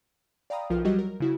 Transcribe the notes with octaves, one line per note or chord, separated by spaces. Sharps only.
D5 F5 G5 A#5 B5 D#6
B1 F3 F4 A#4 F6
F#3 G3 F#4 G4 D#5
A#4
C#3 E4 F#4